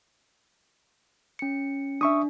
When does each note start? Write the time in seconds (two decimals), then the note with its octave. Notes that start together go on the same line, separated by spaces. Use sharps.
1.39 C#4 C#7
2.01 D4 E5 C#6 D#6